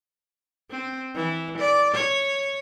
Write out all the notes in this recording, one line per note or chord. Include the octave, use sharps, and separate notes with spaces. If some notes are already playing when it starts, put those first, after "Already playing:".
C4
E3
D5
C#5